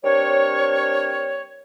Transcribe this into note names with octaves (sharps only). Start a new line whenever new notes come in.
G3 C4 D4 A#4 C#5